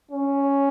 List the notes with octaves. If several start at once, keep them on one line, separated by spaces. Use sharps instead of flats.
C#4